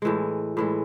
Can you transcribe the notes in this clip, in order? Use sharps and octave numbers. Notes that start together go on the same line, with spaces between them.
A2 E3 G#3
A2 E3 G#3